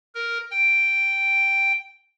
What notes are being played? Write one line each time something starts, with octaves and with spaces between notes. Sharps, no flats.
A#4
G5